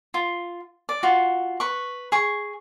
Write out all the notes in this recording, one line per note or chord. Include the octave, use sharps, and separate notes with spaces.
F4
D5
F4 F#4
B4 C#6
G#4 C#6